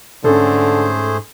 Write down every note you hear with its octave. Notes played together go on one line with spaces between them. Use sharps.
G#2 D3 A3 C#4 G#4 A4 C5